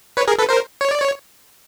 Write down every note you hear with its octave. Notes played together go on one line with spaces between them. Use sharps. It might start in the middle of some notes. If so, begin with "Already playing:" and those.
B4 C#5
G#4 A#4
A4 B4
A#4 C5
C#5
D5
C#5